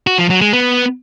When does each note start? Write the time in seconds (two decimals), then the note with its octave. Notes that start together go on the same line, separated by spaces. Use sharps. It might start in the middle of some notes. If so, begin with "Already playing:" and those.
0.07 F#4
0.18 F3
0.30 F#3
0.41 G#3
0.53 B3